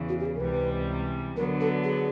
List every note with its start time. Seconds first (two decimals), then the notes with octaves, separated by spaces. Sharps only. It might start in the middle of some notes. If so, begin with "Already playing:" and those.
Already playing: E2 C#3 E3
0.09 F#4
0.20 G4
0.26 G#4
0.35 A#4
0.41 C#2 C3 E3 G3 B4
1.37 D3 F#3 B3 A#4
1.61 A4
1.84 G#4